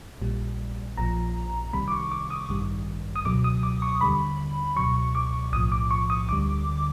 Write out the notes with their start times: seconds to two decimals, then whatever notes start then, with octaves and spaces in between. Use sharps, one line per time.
0.22 A#1 A#2 G3
0.98 A#1 A#2 F3 A#5
1.73 C2 C3 D#3 G3 B5
1.88 D6
1.92 C#6
2.11 D6
2.30 D#6
2.49 A1 G2 D#3 G3
3.16 D#6
3.25 C#2 B2 F#3 D6
3.44 D#6
3.63 D6
3.82 C#6
4.01 D#2 D3 G3 B5
4.76 C#2 B2 F#3 C#6
5.15 D6
5.53 B1 A2 F3 D#6
5.72 D6
5.91 C#6
6.10 D#6
6.29 D2 D3 G3 D6